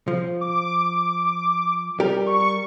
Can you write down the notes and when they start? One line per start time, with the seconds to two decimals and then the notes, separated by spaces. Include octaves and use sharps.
0.08 F3
0.41 D6
2.00 G3 G4 A#4
2.26 C#6